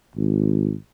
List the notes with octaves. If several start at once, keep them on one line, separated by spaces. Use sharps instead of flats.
G#1